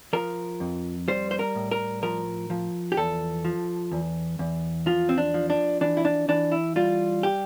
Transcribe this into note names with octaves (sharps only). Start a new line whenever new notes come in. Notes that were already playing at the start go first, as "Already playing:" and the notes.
F3 A#4
F2
G3 C5
C5
A#4
A2
A#4
F3 A#4
F3
G4
E2 A4
F3
E2
E2
F3 F4
C4
D4
F3
D4
E3 D4
E4
D4
E3 D4
E4
G3 F4
G4